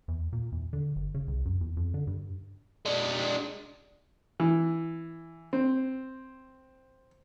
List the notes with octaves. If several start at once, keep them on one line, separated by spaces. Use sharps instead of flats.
E2
A#2
E2
D3
G1
C#3
C2
F#2
E2
F2
D3
G2
G#3 D4
E3
C4